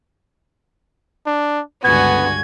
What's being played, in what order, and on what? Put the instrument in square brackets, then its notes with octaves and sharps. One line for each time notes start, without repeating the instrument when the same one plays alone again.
[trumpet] D4
[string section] C#2 G2 D3 [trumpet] B3 [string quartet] F#4 G#5 [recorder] G#6